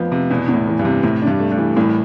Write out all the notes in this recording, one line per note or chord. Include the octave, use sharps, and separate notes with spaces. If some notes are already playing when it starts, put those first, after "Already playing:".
Already playing: F2 F3 B3
C3
E2 B2
E2
A2
E3
G2
C3
A2 C3
D4
G2
A3
G2
E3
C2 A2